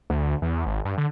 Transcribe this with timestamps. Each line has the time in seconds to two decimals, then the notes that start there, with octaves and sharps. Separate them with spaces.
0.10 D2
0.42 E2
0.66 G#1
0.85 G2
0.98 D3